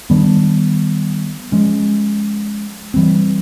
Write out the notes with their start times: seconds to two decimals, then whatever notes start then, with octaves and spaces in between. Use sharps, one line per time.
0.10 D#3 G3 B3 D4
1.52 F3 G#3 C#4
2.94 E3 G3 C4